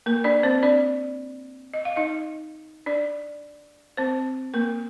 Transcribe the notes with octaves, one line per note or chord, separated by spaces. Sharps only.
A#3 A#4
D4 D5
C4 C5
D4 D5
D#5
F5
D#4 D#5
D4 D5
C4 C5
A#3 A#4